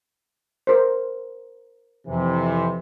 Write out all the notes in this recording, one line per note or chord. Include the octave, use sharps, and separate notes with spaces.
A#4 C5
F2 C3 E3